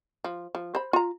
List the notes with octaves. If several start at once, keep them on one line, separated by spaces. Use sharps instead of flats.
F3
F3
C5 B5
F4 A#5